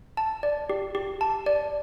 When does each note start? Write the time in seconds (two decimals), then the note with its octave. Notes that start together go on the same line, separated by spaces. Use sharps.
0.17 A5
0.43 D5
0.70 G4
0.95 G4
1.21 A5
1.46 D5